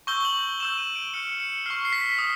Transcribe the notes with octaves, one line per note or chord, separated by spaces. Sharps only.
C#6 E6 G6 G7
G7
F#7
C#6 E6 G6 E7
D#7
D7
C#6 F6 C#7
C#7
C#6 F6 C7
C7
B6
D#6